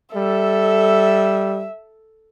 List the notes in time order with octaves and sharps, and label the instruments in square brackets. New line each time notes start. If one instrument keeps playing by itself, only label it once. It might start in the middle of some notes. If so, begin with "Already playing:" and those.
[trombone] G3 [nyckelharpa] A4 [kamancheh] E5